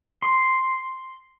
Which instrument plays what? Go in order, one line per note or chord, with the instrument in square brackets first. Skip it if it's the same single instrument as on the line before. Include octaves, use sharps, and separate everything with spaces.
[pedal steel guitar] C6